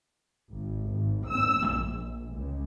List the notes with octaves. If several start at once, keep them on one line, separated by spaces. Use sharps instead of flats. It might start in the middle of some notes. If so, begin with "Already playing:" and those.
G#1
G#1
E6
A#1
C#2